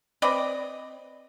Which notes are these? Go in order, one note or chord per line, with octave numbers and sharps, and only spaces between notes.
C4 B4 D5 D#5